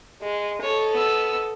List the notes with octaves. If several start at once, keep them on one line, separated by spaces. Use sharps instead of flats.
G#3
A4 C#5 D#5
B3 E6